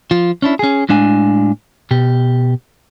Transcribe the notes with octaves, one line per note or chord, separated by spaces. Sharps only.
F3 F4
C#4 D4 E4
C#4 G#4
A2 G#3 D4 F5 G#5
B2 G4